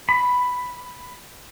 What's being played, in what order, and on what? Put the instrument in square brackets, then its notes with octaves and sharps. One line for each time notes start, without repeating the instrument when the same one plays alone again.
[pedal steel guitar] B5